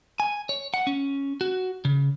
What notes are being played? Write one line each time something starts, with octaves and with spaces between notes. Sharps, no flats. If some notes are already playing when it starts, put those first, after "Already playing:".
G#5
C#5
F#5
C#4
F#4
C#3